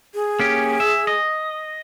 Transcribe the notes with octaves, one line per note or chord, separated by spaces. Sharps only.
G#4
A#3 C#4 G4
E5
D#5